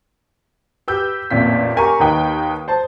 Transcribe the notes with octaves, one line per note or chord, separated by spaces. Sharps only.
G4 B4 E6 G6
A1 F2 A#2 B6
G4 A#4 G#5 A#5 C#6
D#2 D#4 B4 G5 D#6
C5 A5